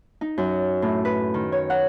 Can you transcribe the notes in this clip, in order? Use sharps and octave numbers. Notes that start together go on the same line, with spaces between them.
D#4
F#2
A2
B4
D#3
C#5
F#5